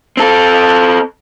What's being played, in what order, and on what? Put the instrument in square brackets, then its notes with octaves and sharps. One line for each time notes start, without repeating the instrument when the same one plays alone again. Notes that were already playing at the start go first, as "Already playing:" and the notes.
[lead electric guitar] C4 A4